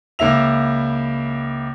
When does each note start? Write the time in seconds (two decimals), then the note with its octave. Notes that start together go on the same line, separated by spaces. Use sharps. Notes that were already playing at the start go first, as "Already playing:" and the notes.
0.19 C#2 A#3 E4 E5 F7